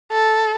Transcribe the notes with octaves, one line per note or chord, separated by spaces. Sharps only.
A4